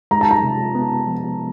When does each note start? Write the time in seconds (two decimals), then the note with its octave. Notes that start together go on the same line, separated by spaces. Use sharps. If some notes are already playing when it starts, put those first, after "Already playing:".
0.11 G#3 A#5
0.21 A5
0.31 A#5
0.43 C3
0.75 B3
1.07 F3